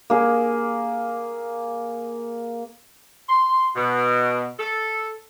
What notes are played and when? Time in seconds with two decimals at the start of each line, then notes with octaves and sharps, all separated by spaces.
0.10 A#3 G#4
3.29 C6
3.76 B2
4.59 A4